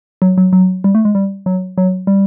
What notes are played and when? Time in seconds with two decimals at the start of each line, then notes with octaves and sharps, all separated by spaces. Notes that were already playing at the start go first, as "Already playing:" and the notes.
0.22 F#3
0.38 F#3
0.53 F#3
0.84 G3
0.95 A3
1.05 G#3
1.15 G3
1.46 F#3
1.78 F#3
2.07 G3